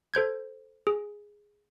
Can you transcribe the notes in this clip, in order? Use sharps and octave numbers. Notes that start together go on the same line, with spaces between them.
A4 C5 G6 G#6
G#4